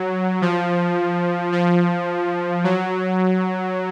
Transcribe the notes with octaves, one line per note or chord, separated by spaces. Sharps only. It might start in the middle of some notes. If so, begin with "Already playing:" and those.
Already playing: F#3
F3
F3
F#3